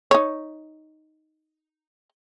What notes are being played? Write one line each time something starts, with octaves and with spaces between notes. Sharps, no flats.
D#4 C#5